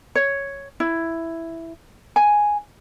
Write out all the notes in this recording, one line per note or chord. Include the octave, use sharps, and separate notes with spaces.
C#5
E4
G#5